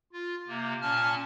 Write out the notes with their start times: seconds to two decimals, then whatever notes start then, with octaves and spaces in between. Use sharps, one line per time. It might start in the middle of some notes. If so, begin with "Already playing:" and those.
0.13 F4
0.48 C3 A#3
0.81 A#2 C#4 A5 F6